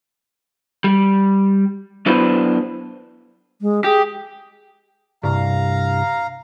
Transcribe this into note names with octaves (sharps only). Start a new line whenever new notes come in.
G3
F#3 B3 D4 E4 B4 C5
G#3
G4 G#4
C2 G2 F5 A#5